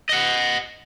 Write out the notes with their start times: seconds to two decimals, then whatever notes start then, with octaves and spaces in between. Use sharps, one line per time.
0.09 D#5 F#5